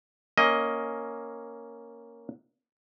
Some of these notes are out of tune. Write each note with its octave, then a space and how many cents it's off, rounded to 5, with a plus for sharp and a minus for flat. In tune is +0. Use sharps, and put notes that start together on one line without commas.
A#3 +0 C#4 +0 D#5 +10